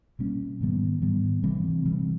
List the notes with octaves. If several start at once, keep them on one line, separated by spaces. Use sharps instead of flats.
B2 G3 A#3 C#4
G#2 D#3 G3 B3
G#2 D#3 G3 B3
C3 E3 G3 C4
C3 E3 G3 C4